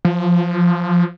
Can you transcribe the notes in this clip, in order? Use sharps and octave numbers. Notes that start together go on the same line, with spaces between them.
F3